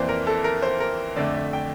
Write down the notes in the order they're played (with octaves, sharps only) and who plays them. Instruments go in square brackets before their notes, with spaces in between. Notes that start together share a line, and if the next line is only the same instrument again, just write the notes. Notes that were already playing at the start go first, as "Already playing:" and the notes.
Already playing: [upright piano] F2 E3 A#3 C5 D5
A#4
A4
A#4
C5
A#4
F2 D3 A3 D5
E5
G5